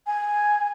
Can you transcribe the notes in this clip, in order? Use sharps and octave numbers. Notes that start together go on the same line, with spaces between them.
G#5